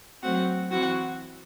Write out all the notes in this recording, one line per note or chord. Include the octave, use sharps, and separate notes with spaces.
F#3 A3 C4 F#4 F#5
E3 C4 E4 F#4 F#5